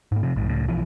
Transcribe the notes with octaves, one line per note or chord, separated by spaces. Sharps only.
G#2 A#3
C3 F3
A#1 G#2
C#2 A2
B1 B2 E3 F3